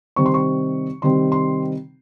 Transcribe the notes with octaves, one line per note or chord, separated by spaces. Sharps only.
C3 D#3 G3 C4 C#6
C6
C#6
C3 D#3 G3 C4 C6
C6